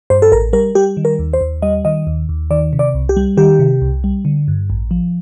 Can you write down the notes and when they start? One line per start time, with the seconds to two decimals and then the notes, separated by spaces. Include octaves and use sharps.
0.10 G2 C5
0.22 A4
0.32 A1 A#4
0.53 G3 A#4
0.75 G3 G4
0.97 D#3
1.05 A#4
1.19 D#2
1.33 C5
1.41 D#2
1.62 G3 D#5
1.85 D#3 D#5
2.07 D#2
2.29 D#2
2.50 D#3 D5
2.73 C3
2.79 D5
2.94 C2
3.09 G4
3.17 G3
3.37 D#3 G4
3.59 C3
3.81 C2
4.04 G3
4.25 D3
4.48 G2
4.70 A1
4.91 F3